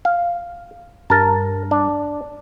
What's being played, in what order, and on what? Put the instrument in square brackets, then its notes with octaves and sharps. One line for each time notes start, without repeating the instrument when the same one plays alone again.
[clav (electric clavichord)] F5
[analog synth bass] G2 [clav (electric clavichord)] A#4 A5
[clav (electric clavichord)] D4